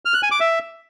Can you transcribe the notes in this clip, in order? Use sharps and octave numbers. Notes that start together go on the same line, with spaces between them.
F6
F#6
G#5
D6
E5